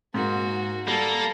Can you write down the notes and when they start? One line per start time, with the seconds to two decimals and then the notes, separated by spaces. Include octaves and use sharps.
0.14 G#2 A#3 F#4
0.88 G3 A#3 A4